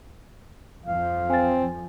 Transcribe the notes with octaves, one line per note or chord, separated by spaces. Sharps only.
F2 F3 F5
C4 G#5 A6